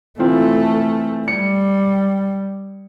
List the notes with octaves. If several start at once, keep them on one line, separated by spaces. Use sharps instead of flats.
E3 A3 C4 F4
G3 C#7